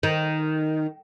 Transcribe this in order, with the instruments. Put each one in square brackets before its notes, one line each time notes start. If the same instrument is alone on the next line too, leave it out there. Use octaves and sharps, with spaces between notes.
[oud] D#3